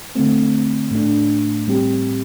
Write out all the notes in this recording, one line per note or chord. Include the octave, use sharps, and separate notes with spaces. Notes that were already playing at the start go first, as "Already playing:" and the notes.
D3 A3 C4
A2 A3 D4
A2 G3 C4 G4